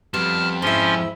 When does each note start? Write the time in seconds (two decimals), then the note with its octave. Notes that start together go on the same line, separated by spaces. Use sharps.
0.14 F2 G3 B3 A5 F6
0.62 G#2 F3 C#4 E4 C6